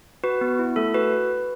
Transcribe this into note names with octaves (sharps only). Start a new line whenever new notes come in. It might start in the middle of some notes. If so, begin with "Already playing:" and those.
F#4 B4
B3
E4
A3 A4
F#4 B4